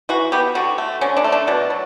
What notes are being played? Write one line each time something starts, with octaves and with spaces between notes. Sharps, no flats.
E3 F#4
B3 G4
D3 F#4
A3
D3 C#4
D4
A3
D4
B2 D4
F#3